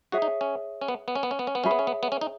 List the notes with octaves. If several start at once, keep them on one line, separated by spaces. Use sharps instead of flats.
F#4 G#4 C#5 E5
D#4
C#4
C#4
B3
B3
C#4
B3
C#4
B3
C#4
B3
C#4 G#4 C#5 E5 B5
B3
C#4
B3
B3
C#4
D#4